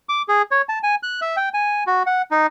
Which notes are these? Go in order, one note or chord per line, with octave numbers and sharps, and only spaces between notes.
D6
G#4
C#5
A5
G#5
F#6
E5
G5
G#5
F#4
F#5
D#4